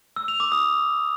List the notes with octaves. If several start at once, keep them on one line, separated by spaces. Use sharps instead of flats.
E6
F7
D6
D#6